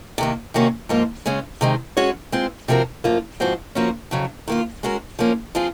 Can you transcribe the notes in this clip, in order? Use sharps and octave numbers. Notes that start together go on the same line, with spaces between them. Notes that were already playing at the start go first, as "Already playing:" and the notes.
C3 D#3 A#3
C3 D#3 A#3 C#4 F#4
G#2 F3 A#3 F4
C#3 G#3 C#4
C3 D#3 G#3 D#4
G#3 C#4 F#4 C#5
G#3 C4 F4
C3 F3 C4 F#4 A#4
F#2 F3 A#3 F4
G#2 F3 C4 F#4 C5
F3 A#3 C#4 F#4 A#4
F2 C#3 F#3
D#3 A#3 F4
G#3 C#4 F#4 A#4
F3 A#3 C#4
F3 C4 F4 G#4